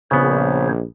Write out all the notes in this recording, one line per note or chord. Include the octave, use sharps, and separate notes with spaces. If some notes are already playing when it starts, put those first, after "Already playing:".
A#1 C#3 B3 C5 C#5